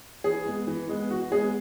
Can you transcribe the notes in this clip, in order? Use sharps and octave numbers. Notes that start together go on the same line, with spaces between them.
E3 G#4
G#3 B3
E3
G#3 B3
E3 F#4
G#3 B3 G#4